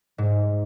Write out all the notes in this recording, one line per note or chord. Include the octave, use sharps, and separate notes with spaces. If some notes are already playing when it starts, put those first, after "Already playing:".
G#2